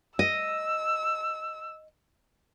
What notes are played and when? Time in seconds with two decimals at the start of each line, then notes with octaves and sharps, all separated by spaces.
0.19 D#5 E6